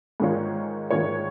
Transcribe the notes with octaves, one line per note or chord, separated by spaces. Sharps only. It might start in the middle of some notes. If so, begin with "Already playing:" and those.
G#2 D#3 G#3 F4 C#5
G#2 D#3 G#3 F4 C#5